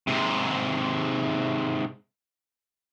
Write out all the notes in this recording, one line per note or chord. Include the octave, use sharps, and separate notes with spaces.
G#2 C3